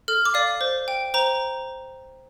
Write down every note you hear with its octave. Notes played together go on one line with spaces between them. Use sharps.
A4 F6
D6
D5 F5
C5
G5
C5 A#5